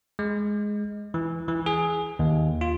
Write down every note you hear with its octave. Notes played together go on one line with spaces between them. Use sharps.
G#3
E3
E3
G#4
D#2
F4